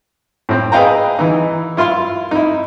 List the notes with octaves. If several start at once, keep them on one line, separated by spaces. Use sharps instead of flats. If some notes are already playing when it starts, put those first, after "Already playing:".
A2 C4
G#4 B4 D#5 F5 G5 A#5
E3 D#4
E4 F4 F5 C6
D#4 E4